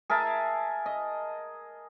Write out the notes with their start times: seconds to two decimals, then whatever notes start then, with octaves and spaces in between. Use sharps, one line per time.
0.10 G#4 A#4 E5 A5
0.86 D#5